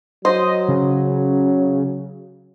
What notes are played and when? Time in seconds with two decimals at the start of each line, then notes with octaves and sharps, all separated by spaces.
0.25 F#3 C5 D#5
0.68 C#3